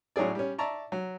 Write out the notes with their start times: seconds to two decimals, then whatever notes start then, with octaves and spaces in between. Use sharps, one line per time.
0.16 A2 F#3 C#4 G#4 D5
0.35 G3 C#4
0.59 D5 E5 A5 A#5 C#6
0.92 F#3